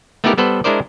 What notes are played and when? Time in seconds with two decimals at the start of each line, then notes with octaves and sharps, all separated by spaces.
0.24 A3 B3 D#4 E4 G4 A#4
0.38 G3 B3 A4 B4 C5
0.64 G#3 D4 E4 A#4 C5 D5